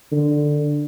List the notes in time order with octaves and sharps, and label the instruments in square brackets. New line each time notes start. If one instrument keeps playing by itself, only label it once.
[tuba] D3